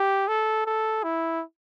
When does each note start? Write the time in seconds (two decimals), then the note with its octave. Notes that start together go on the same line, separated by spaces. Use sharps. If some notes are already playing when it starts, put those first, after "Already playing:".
Already playing: G4
0.28 A4
0.66 A4
1.04 E4